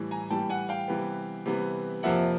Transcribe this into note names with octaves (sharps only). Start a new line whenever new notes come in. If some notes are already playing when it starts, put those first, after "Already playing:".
Already playing: A2 E3 G3
G#5 A#5
A2 E3 G3 G5 A5
F#5 G#5
F5 G5
C3 E3 G3 B3
C3 E3 G3 B3
F2 C3 F3 A#3 E5 F#5